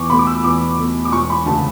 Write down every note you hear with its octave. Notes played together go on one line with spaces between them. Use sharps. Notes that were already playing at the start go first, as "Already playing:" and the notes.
Already playing: E2 C#6 D6
B2 A3 B5
D6
E6
E2 D6
B2 A3
D6
E1 C#6
B5
D2 C#3 A5